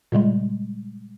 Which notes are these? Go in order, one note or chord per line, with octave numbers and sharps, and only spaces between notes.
A#2 C#3 G3 G#3